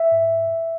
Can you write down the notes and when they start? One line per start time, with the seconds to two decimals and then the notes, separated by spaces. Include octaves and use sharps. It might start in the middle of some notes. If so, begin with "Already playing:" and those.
Already playing: E5
0.12 G#2